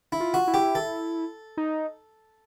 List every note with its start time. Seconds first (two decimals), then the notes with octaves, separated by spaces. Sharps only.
0.12 E4
0.20 F4
0.34 F#4
0.47 E4
0.54 G4
0.75 A4
1.57 D#4